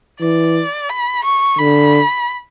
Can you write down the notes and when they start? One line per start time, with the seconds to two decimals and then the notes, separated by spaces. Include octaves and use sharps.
0.21 E3 D5
0.89 B5
1.24 C#6
1.58 D3 B5